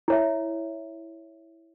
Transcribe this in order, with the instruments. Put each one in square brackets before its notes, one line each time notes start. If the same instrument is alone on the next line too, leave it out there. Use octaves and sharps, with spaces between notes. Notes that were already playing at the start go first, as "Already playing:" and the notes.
[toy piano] E4 C#5 E5